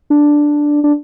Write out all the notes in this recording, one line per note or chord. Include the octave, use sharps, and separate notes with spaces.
D4
D4